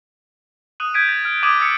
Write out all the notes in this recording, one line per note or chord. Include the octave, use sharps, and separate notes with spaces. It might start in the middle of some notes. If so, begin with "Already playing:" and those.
D#6 F#6 D#7 F#7
G6 G#6 B6 D7 D#7
A6
F6
D6 D#6 G#6 D#7 F#7
D#6 E6 A6 C#7